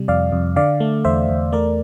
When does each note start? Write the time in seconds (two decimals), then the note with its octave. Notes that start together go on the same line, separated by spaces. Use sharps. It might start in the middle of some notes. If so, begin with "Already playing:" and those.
Already playing: C3 G3
0.08 F2 D5 F5
0.32 F2
0.56 D3 D5 F5
0.80 A3
1.05 E2 C5 E5
1.29 E2
1.52 A3 A#4 D5